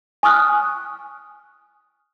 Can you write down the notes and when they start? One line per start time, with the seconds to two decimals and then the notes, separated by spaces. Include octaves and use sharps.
0.23 G#5 C#6 D#6 F6 F#6